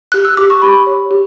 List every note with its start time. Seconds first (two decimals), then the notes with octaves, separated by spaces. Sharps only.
0.12 G4 F#6
0.25 E6
0.37 G4 D6
0.50 C#6
0.62 G4 B5
0.87 C#5
1.11 G4